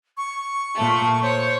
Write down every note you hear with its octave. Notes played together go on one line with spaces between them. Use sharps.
C#6
A#2 A3
C5 C#5 C#6